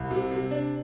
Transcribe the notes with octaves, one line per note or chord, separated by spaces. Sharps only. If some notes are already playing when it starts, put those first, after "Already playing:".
Already playing: C2
C3
C3
D4